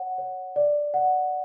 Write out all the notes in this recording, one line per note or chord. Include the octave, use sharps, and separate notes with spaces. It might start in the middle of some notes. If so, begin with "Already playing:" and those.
Already playing: C#5 F#5
C#5
D5
F#5